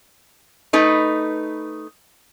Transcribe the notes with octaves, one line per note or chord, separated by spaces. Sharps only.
A3 D#4 B4